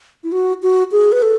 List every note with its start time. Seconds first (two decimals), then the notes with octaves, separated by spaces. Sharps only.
0.23 E4
0.32 F#4
0.62 F#4
0.92 G#4
1.12 B4
1.22 A4